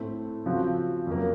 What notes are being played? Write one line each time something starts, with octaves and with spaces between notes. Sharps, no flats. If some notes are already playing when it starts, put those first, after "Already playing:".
Already playing: A2 A3 C4
C#3 F3 C4 F#4
F2 C#3 F#3 A#3